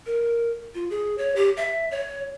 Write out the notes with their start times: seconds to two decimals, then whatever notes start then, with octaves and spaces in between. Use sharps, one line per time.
0.06 A#4
0.75 F4
0.90 G#4
1.18 C#5
1.36 G4
1.57 E5
1.91 C#5